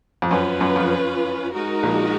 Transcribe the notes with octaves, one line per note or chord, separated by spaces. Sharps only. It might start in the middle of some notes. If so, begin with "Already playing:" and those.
F2
F#2 C#4 F4 B4
F#2
F2
G#3 D#4 F#4 A#4
A#1 A#2